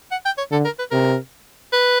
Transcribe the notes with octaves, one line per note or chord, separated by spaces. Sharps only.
F#5
G5
C#5
D3 A4
A#4
B4
C3 A#4
B4